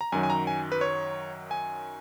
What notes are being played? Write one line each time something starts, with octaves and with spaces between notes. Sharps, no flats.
A#5
F#2 D#3 F#3 G#5
G#5
A#5
G#5
B4
C#5
G#5